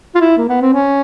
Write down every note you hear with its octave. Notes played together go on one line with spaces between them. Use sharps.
F4
E4
A#3
B3
C4
C#4